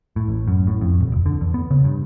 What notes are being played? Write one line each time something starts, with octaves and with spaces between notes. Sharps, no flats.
A2
A1
F#2
A2
F2
D#1
F1
D3
E2
B3
C#3
G2